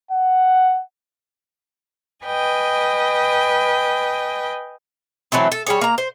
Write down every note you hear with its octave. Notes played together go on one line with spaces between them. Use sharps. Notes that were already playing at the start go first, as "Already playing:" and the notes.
F#5
B4 D#5 G5 G#5
E3 F#3 A3 C4
A4
G3 G#4 C#5
A#3 A#5
C5